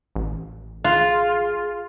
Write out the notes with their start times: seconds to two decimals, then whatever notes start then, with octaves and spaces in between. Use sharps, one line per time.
0.16 A1
0.84 F4 G#4